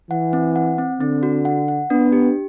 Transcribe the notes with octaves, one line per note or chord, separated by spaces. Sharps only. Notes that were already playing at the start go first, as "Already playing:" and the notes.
E3 F#5
C4
F#5
C4
D3 C4
F#4
F#5
F#5
B3 D4
G4